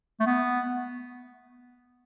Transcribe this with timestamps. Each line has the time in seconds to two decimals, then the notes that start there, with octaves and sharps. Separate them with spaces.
0.20 A3
0.26 B3